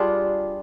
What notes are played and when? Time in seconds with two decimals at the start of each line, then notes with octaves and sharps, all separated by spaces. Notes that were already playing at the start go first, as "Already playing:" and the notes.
Already playing: G3 D4 F4 G#4